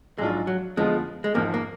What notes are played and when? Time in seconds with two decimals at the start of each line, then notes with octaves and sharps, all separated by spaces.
0.18 A#1 G#2 F#3 G#3 D4 F4
0.47 F#3
0.77 D3 F3 G#3 B3 F4 B4
1.24 G#3
1.35 G#1 G#2 F3 A#3
1.54 A#3